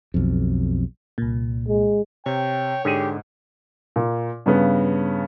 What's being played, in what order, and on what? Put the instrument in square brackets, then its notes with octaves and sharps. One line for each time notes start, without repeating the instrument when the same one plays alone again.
[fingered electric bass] B1 F2
[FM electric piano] C2 A#2
[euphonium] G#3
[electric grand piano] C3 [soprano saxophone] C#5 [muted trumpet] G5
[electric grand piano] G#2 [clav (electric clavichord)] D3 G#4 [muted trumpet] G4
[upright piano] A#2
G2 C#3 B3